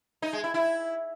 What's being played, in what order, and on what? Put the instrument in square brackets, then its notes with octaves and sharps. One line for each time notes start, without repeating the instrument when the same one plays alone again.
[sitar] D#4
G#3
E4
E4